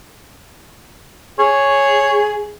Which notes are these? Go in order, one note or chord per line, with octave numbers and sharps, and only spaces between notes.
G#4 C#5